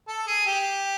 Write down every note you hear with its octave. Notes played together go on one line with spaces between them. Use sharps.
A4
G#4
G4